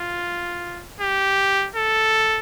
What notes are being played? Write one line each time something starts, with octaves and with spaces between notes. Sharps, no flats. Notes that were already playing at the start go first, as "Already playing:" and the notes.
Already playing: F4
G4
A4